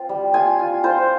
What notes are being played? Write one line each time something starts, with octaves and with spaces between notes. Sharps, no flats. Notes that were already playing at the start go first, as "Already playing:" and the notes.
Already playing: C4 F4
G3
F4 G#5
F4
F4 C5